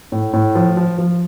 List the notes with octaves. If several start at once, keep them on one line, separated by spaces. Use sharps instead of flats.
A2
A2
F3
F3
F3